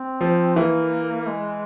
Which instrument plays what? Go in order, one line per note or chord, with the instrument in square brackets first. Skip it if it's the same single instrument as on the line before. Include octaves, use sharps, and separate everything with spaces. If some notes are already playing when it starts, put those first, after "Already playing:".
Already playing: [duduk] C4
[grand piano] F3
[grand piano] E3 [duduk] A#3
[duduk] G#3